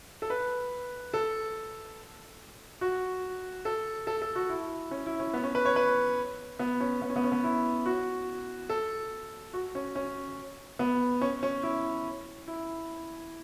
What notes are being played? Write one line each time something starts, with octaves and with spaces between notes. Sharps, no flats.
A4
B4
A4
F#4
A4
A4
A4
F#4
E4
C#4
E4
C#4
B3
C#4
B4
C#5
B4
B3
C#4
B3
C#4
B3
C#4
B3
E4
F#4
A4
F#4
C#4
C#4
B3
C#4
C#4
E4
E4